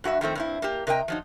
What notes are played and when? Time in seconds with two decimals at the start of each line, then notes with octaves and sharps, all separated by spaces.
0.04 G2 F#4 G#4 E5
0.21 D#3 F3 A3 C4
0.35 G2 C4 E4
0.62 A#3 G4
0.87 C3 A#4 D#5 G5
1.08 F3 F#3 D#4